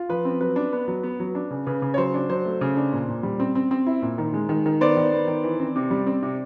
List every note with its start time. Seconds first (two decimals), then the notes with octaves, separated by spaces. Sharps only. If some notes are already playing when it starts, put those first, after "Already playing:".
Already playing: F4
0.09 F3 B4
0.25 C4
0.41 F#3 B4
0.56 D4
0.73 B3
0.88 F#3
1.03 B3
1.20 F#3
1.35 D4
1.51 C#3
1.67 C#3 B4
1.82 C#3
1.94 C#5
1.98 F#3 C5
2.14 D4
2.29 F#3 C5
2.45 A3
2.61 C#3
2.77 D4
2.93 A#2
3.08 A#2
3.23 G3
3.40 C4
3.55 C4
3.71 C4
3.87 E4
4.02 A#2
4.18 D#3
4.34 G#3
4.49 D#3
4.66 D#3
4.81 B3 C5 D5
4.97 D#3
5.12 B3
5.28 D#3
5.43 E3
5.60 C4
5.76 C3
5.91 G3
6.06 C4
6.23 C3